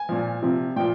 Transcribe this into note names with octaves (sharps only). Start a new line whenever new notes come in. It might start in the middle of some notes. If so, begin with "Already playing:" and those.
Already playing: G#5
A#2 F3
C3 F3
A#2 F3 G5